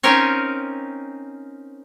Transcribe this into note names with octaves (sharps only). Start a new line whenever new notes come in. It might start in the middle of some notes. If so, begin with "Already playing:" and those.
C4 C#4 D#4 F4 A#4 C#5